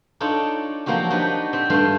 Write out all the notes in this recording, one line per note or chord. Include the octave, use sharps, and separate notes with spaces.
D4 D#4 F4 A4 C#5 D5
F3 F#3 A#3 C4 F#4 G4
D4 D#4 F#4 G4 B4 D#5
C4 G4
G2 A3 D4 C5 F5